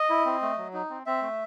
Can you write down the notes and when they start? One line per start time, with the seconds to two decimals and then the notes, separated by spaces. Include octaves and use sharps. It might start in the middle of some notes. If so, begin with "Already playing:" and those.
Already playing: D#5
0.10 E4
0.25 C4
0.42 A3
0.57 F#3
0.74 D#4
0.90 C4
1.06 C4 E5
1.22 A3